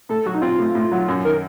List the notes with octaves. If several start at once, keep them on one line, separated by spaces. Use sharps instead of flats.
A2 A4
F#3 F#4
D#4
C4 F4
A2
A2
F#3
F#2
D#3 A#4